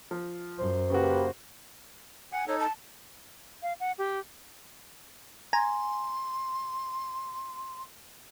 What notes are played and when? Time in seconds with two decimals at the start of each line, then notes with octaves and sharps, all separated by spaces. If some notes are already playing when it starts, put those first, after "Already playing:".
0.11 F3
0.58 F#2 C5
0.90 C#3 A#3 F#4 G4 B4
2.33 F#5 G#5
2.48 D#4 A4 C#5
2.60 A5
3.63 F5
3.80 F#5
3.98 G4
5.53 G#5 A#5 C6